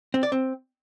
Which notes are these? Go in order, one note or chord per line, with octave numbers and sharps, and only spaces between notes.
C4
D5
C4